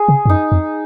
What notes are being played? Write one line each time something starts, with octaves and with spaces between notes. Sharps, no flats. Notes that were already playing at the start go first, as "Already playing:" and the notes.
Already playing: G#4
C#3
G#2
F#2 D#4
F2